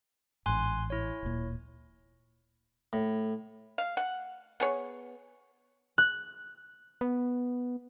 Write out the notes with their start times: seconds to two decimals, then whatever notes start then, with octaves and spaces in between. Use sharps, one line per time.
0.46 A1 G#2 G#5 C6 F#6
0.90 E4 C#5
1.22 D1 A#2
2.93 A2
3.78 F5
3.97 F#5
4.60 B3 G#4 C#5
5.98 F#6
7.01 B3